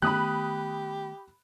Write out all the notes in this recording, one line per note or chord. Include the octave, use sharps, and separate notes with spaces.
D#3 A3 B3 G4 B5 D#6 F#6